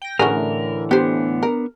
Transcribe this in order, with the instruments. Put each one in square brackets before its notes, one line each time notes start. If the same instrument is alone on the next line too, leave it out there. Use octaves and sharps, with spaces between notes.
[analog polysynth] G5 A#6
[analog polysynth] A2 D3 E3 [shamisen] C#4 F#4 G#4 [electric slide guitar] A#4
[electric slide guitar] B3 D4 [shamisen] G4 C5
[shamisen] A#4